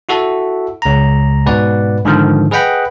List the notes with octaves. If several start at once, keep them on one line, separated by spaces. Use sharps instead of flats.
E4 F#4 A4 E5
C#2 A#5
G#2 B2 B4 D5 F#5
G#2 D3 D#3 F3
G#4 B4 D#5 F#5 G5 B5